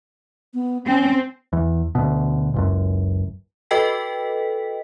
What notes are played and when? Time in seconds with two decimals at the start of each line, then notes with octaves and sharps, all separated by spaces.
0.54 B3
0.87 C4 C#4
1.53 E2
1.95 D2 B2
2.54 F#1 C#2 F#2
3.71 F#4 A4 B4 D#5 G5 B6